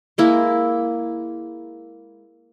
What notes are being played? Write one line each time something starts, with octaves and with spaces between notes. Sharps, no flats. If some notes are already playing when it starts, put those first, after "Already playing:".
G#3 A#3 E4